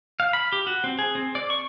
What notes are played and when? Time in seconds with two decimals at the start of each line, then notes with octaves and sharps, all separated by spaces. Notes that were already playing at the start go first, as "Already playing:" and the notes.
0.20 F5
0.33 B5
0.52 G4
0.67 F#4
0.84 C4
0.99 G#4
1.15 C4
1.35 D5
1.50 C#6